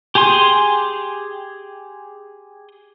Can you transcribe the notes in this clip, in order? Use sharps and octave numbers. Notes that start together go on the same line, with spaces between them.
G4 G#4 G#5 C6